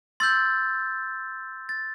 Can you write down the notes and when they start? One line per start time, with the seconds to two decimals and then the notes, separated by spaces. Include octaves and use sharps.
0.20 C6 E6 G6 A6
1.69 A6